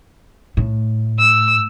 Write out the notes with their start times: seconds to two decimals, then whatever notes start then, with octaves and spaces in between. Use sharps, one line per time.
0.57 A2
1.18 E6